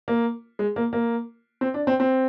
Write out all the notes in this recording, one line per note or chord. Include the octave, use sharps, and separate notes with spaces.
A#3
G#3
A#3
A#3
C4
D4
C4
C4